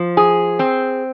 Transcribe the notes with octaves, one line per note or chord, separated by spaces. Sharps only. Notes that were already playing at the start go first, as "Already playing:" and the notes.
Already playing: F3
G#4
C4